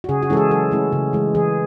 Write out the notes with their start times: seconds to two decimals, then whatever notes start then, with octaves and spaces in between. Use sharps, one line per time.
0.04 F#4
0.09 C#3 G#4
0.22 F#4
0.30 E3 G#3 C#4 E4 A4
0.37 G#4
0.51 F#3 A4
0.71 A3 C#4 E4
0.92 C#3
1.13 E3 G#3
1.35 E3 G#4